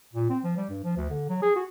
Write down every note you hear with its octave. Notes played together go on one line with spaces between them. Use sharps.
A#2
C4
F3
G3
G2
F3
D2
D3
F#3
G#4
F#4